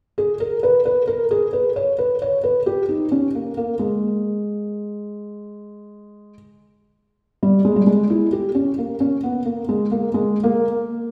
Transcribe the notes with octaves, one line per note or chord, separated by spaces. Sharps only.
G#4
A#4
B4
B4
A#4
G#4
B4
C#5
B4
C#5
B4
G4
D#4
C#4
A#3
A#3
G#3
G3
G#3
G3
G#3
E4
G4
C#4
A#3
C#4
B3
A#3
G#3
A#3
G#3
A#3